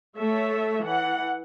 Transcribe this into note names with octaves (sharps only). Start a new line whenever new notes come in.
A3 A4 C#5 E5
E3 F#5